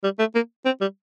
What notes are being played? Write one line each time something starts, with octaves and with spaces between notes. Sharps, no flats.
G3
A3
A#3
C4
G3